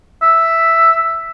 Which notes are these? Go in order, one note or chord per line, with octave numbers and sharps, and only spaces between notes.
E5